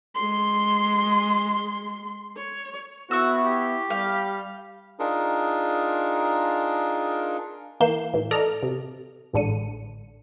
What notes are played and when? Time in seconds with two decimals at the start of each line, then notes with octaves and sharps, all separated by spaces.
0.15 G#3 C6
2.37 C#5
3.11 B3 E4 F#4 C#6 E6
3.45 G4
3.90 G3 F5
4.99 D4 D#4 F4 G#4 A#4
7.80 E3 A#3 G6 C7 E7
8.14 A2 E3
8.31 A4 D5 D#5 A#5 F6
8.63 C3
9.33 A1 G#2 D3 C#7 D#7